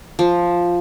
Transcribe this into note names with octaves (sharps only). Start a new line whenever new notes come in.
F3